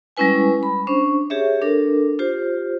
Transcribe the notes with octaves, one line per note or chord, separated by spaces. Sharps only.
G3 G#3 C#4 E4 B4 G#5
B5
C#4 D4 C5 C#6
G4 G#4 C#5 E5
D4 A4 A#4
F4 G4 C5